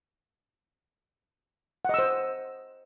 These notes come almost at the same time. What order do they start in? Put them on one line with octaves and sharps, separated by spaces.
F#5 D#5 E6 C5